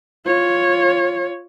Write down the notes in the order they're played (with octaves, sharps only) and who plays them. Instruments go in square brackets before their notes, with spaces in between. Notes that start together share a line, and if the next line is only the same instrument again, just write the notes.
[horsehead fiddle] F4 C#5